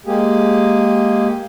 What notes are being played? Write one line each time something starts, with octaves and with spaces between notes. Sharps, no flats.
G#3 A#3 G4 G#4